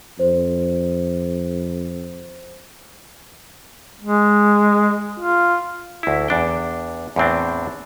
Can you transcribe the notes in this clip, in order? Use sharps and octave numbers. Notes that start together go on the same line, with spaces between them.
F2 C5
G#3
F4
D2 E4
E2 D4 G5
E2 A2 C4 D4